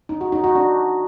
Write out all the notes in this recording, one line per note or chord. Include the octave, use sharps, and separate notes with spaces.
D#4
F#4
D#4
F#4
D4